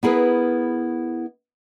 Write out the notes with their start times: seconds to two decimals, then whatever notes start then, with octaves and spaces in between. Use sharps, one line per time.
0.03 B3 E4 G#4 A#4 B4